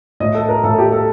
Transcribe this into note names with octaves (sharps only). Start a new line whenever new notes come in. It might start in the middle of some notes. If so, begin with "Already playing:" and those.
A2 D#5
A4
A#4
A2 A4
G4
A4